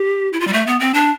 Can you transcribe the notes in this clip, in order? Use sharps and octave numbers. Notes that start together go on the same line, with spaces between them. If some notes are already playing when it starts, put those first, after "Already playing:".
Already playing: G4
E4
F4
G3
A3
B3
C4
D4